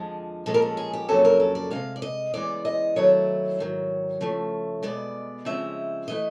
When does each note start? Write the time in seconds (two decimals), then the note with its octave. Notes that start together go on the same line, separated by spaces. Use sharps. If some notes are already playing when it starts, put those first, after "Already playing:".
Already playing: F2 D3 F3 G#3
0.46 A#2 F3 G#3 C#4 A4
0.54 A#4
0.62 A4
0.77 G#4
0.93 G4
1.09 F2 C#3 F#3 A#3 C#4 A4
1.25 A#4
1.40 A4
1.55 D5
1.71 C3 E3 G#3 F5
1.96 D5
2.02 D#5
2.34 C#3 E3 G#3 B3 D5
2.65 D#5
2.96 D#3 F#3 A3 C4 E4 C#5
3.59 G#2 D#3 F#3
4.21 C#3 F3 A3
4.83 B2 G#3 B3 D5
5.45 C#3 F3 G#3 C4 E5
6.08 E3 A3 D#5